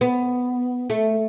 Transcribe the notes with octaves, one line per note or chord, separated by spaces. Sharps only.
B3
A3